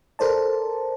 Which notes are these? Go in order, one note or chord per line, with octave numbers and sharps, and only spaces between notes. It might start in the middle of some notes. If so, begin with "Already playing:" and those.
A4 A#4 C5 D5 A5